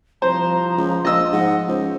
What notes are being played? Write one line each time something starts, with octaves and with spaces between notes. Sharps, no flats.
C2 F3 C5 A#5
C#2
A#1 D#5 E6
G#2 F#5
C#2 C5